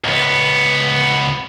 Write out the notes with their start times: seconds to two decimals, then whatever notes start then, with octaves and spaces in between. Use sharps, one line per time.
0.04 C#2 B3